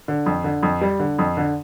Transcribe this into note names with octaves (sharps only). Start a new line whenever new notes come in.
D3
F2
D3
F2
G3
D3
F2
D3